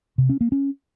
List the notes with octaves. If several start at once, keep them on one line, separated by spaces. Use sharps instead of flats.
C3
C#4
A#3
C#4